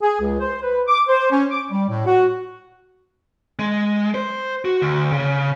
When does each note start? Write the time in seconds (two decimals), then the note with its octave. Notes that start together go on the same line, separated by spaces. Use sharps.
0.02 G#4
0.21 C#2
0.40 C5
0.63 B4
0.88 D6
1.08 C5
1.31 C#4
1.51 D6
1.70 G3
1.89 A2
2.06 F#4
3.59 G#3
4.14 C5
4.65 F#4
4.82 D2
5.12 C#3